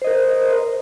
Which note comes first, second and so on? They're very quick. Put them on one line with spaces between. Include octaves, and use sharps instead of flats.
C5 D#5 A#4